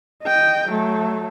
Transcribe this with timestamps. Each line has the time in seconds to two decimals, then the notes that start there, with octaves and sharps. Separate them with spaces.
0.24 D#5 G5
0.69 F#3 A3